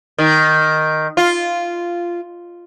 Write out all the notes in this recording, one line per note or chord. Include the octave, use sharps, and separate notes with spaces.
D#3
F4